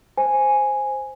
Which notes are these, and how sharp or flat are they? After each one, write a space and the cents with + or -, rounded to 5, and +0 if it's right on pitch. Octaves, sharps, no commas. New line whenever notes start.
C5 +0 G#5 +0